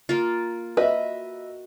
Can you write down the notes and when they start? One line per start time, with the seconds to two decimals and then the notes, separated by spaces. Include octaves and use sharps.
0.09 A#3 F4
0.77 F#4 B4 D#5 E5